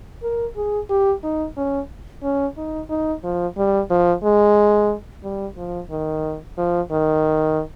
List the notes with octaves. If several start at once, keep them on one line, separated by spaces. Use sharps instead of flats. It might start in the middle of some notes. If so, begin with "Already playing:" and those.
A#4
G#4
G4
D#4
C#4
C#4
D#4
D#4
F3
G3
F3
G#3
G3
F3
D#3
F3
D#3